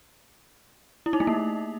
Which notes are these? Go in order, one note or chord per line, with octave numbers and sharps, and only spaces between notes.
E4
D#4
A3
A#3